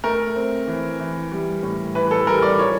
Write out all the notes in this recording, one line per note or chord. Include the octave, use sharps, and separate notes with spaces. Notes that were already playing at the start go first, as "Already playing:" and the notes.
A3 A#4
C4
E3
E3
G3
A2
E3 B4
A4
G3 A#4
D5
F3 C#5